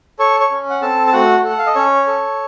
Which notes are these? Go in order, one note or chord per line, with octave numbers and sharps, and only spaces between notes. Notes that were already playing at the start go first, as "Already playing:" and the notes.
A4 C#5 C#6
C#5 C#6
C#4
F#5
C4 A4 A5
A5
A3 F#4 F#5
A4
F#5
F5
D#5
C#4 C#5
A4